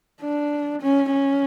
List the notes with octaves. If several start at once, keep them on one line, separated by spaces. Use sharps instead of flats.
D4
C#4
C#4